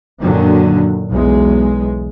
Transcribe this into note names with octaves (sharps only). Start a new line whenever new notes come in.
F#2 A#2 D3 D#3 F#3
B1 E2 G#3